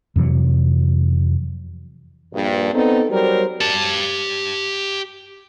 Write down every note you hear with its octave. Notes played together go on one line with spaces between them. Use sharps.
F2 C3 E3 F#3
A#1 G2
B3 C4 D#4 A4
F#3 G3 A#4 C5
G4 A5